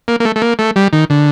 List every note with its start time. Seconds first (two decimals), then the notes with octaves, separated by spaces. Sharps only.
0.08 A#3
0.20 A#3
0.25 A3
0.36 A3
0.42 A#3
0.59 A3
0.76 G3
0.93 D#3
1.10 D3